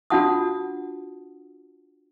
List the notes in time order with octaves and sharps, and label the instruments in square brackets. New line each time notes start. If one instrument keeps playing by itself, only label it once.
[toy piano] D4 F4 F#4 F#5 A5 D#6